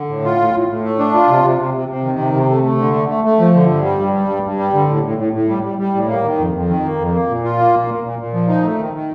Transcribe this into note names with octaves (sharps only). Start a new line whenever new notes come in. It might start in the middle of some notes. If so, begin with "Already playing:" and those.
Already playing: D3
A2
F4
A2
A2
A2
A3
D4
F4
C3
C3
C3
C3
C3
D#3
C3
C3
A3
A3
D3
A3
A3
A3
F3
D3
G2
G3
G2
G3
G2
G2
G3
D3
A2
A2
A2
A2
G3
G3
G3
A2
A#3
D#3
F2
F2
D#3
A#3
F2
A#3
A#2
F4
A#3
A#2
A#2
A#2
A#2
F3
D#4
A3
D#3
D#3